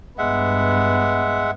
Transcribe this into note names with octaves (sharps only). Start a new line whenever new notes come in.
G2 G#3 B3 E5 F#5